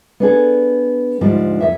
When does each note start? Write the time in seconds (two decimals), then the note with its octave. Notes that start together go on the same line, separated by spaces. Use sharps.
0.20 B3 D4 G#4 A4
1.21 D2 G#2 F3 G3 D4
1.61 F2 C3 E5